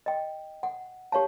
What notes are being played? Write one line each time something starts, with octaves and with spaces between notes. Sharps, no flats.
D#5 G5
F#5
G4 C#5 F5 A5